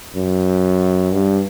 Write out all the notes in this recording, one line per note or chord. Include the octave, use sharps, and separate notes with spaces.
F#2
G2